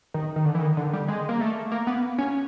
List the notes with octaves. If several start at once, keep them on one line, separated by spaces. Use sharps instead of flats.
D#3
D#3
D3
E3
D#3
D3
G3
G#3
A#3
A3
A#3
B3
C#4